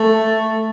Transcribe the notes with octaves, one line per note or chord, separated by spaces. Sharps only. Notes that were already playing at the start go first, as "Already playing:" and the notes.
Already playing: A3